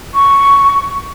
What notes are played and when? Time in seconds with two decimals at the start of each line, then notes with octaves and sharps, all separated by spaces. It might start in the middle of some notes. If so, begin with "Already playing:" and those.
0.14 C#6